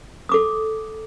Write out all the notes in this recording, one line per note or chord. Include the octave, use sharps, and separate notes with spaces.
A4 D6 D#6